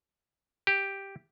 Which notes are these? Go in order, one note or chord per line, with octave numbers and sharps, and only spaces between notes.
G4